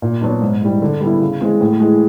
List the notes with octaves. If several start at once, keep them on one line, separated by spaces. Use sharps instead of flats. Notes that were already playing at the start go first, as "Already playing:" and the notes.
A#2
F#3 B3 D4
G#2
E3 G3
D3
G3 B3 E4
C#3
E3 G#3 C4
A2
E3 G#3